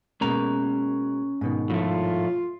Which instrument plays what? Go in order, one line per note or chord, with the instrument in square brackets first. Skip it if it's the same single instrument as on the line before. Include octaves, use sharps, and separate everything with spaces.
[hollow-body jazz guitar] B2 G#3 A#3 [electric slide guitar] C#4 A#5
[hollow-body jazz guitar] G#2 B2 D#3
[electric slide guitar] A2 F3 A3 [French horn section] F4